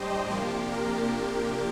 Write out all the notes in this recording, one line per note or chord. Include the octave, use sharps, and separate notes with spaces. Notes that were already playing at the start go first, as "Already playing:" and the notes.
Already playing: A2 G3 D4 G4 C5 D#5
C3 F3 A#3 D4
A#4